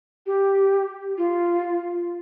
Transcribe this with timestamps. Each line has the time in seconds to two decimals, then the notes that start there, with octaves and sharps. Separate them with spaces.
0.26 G4
1.18 F4